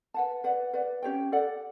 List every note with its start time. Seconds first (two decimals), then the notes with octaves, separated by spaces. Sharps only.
0.14 B4 F#5 A5
0.44 B4 D5 F#5
0.73 B4 D5 F#5
1.03 C#4 G4 C#5 G5
1.32 A4 D5 F#5